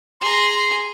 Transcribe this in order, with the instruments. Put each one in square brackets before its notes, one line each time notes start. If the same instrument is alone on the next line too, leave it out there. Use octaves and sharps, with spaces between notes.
[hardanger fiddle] G#4 A#5 [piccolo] C6
[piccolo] C6